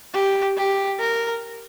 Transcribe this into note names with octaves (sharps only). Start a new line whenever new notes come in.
G4
G4
A#4